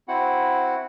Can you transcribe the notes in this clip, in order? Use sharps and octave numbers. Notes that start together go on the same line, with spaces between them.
C4 E4 F#4 F#5